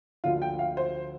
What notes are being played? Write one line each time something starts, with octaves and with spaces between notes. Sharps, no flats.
D2 D3 F3 F4
G5
F5
C5